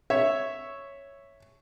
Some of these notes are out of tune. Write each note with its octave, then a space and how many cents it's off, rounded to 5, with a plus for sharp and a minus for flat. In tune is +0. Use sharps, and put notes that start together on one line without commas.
C#5 +0 E5 +0